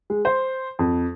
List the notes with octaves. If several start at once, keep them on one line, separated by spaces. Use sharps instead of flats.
G#3
C5
F2